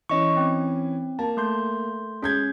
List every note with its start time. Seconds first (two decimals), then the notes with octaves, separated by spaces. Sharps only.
0.09 E3 C#4 D#5 C#6
0.37 C4
1.19 A#3 A5
1.37 A3 C6 G6
2.23 G#3 C#4 G6 G#6